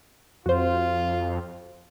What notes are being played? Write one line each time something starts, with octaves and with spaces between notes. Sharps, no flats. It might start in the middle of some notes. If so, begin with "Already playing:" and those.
F2 F4 F#4 C5